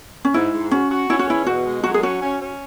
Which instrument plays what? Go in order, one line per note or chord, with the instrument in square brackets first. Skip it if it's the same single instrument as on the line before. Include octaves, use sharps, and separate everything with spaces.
[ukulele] C#4
[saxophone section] G#2 [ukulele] E4
[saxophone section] G#2
[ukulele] C#4 [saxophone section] F#4
[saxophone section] F#4
[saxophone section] C#4 [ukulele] E4
[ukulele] F#4
[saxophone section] E2 [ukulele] E4
[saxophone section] B2 [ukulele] F#4
[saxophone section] G#3
[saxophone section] F#3 [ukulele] F#4
[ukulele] G#4
[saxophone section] C#4 [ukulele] F#4
[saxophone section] C#4
C#4